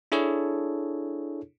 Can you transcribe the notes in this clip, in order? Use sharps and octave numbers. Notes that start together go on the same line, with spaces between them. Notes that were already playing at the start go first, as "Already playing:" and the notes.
D4 E4 G#4 A4 C#5